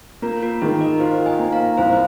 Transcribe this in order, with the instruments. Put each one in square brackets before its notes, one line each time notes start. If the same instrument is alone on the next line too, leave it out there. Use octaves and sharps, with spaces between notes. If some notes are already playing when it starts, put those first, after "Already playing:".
[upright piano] A#3 [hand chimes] F4 A#4
[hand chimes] F4 A#4
[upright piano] D#3 [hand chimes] G#4
[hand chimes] A#4 D#5
[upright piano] F4 [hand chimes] C5 F5
[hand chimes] D#5 G#5
[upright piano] A#3
[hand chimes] F5 A#5
[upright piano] C2 [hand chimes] C5 F5